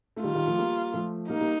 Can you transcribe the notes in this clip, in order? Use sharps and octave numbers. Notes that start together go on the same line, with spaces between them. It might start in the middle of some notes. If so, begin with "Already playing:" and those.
A3
D#3 G3 F4
D#3 G3
F3 A3
G3 A#3
F3 A3
G3 A#3 D#4
G3 A#3